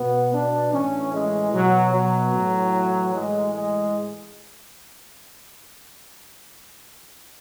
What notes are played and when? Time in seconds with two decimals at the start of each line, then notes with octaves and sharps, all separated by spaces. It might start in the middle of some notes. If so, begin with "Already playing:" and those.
Already playing: B2 B3
0.32 D4
0.72 A2 E3 C#4
1.13 G#3
1.52 B2 F#3
1.92 F#3
2.32 A2 E3
3.12 A2 E3 G#3
3.53 G#3